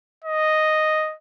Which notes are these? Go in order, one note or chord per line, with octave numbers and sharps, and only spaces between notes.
D#5